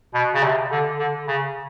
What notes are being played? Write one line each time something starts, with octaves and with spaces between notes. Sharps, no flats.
B2
C#3
C3
D3
D3
C#3